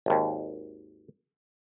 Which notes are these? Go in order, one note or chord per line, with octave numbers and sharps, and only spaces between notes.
G#1 D#2